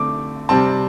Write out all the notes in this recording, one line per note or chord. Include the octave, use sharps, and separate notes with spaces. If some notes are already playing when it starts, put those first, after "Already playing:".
Already playing: D3 A3 C4 D6
C3 G3 C4 A5